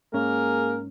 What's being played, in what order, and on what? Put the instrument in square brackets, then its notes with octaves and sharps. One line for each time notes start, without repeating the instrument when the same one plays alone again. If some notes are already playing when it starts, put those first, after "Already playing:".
[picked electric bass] G#2 C#4 [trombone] A#3 [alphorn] G#4 [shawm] A#4